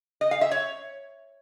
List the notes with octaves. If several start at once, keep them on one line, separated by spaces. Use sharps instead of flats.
D#5
F5
E5
C#5